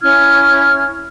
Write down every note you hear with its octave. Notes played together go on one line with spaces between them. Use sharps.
C#4 E4 F6 G#6